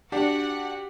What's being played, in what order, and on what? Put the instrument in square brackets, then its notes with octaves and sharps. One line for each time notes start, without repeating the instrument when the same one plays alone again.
[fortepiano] D4 [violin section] F#4 F#5 [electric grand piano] G4